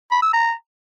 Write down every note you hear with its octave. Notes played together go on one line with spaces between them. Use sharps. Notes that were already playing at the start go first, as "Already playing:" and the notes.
B5
E6
A#5